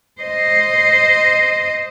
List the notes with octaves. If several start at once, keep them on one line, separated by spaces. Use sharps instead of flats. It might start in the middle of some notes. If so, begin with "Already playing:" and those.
C5 D#5